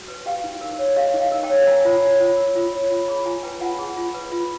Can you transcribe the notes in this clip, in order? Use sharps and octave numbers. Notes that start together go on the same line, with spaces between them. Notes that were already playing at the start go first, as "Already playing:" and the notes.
Already playing: F#4
B4
G4 F5 G5
D#4
A#4
C#5
G4 D#5 F5
D#4
F5 G5
A#4
G5 A5
C#5
A#4 G#5 A#5
F4
C#5
F4
A#4
F4
C#5
F4
G#4 A5 B5
F4 G#5 A#5
B4 G5 A5
F4 F#5 G#5
G#4
F4
B4
F4